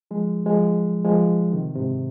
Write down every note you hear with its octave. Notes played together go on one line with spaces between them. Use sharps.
F3 G#3
F3 G#3
F3 G#3
C3 D#3
G#2 C3